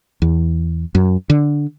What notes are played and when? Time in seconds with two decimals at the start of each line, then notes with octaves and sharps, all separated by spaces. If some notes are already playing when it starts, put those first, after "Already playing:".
0.22 E2
0.95 F#2
1.30 D3